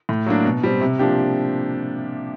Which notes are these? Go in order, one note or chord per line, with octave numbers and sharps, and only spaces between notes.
A2
F#3 A#3 D4
B2
G3 C4
C3
F3 A#3 D4 G4